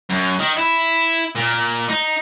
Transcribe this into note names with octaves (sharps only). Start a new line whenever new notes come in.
F#2
D#3
E4
A#2
D#4